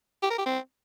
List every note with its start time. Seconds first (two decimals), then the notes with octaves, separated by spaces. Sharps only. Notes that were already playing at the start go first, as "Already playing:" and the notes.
0.23 G4
0.30 A#4
0.38 G4
0.46 C4